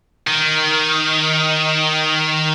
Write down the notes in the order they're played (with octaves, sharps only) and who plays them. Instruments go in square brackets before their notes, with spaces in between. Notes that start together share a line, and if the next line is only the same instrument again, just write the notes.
[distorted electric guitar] D#3